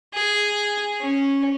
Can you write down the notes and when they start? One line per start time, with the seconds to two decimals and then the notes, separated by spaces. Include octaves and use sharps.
0.14 G#4
1.01 C#4